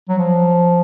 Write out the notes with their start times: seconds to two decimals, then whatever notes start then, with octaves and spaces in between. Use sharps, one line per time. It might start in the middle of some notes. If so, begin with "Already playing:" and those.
0.09 F#3
0.19 F3